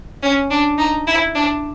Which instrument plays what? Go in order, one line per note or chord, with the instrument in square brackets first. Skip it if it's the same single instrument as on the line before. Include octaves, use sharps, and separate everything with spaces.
[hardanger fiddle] C#4
D4
D#4
E4
D4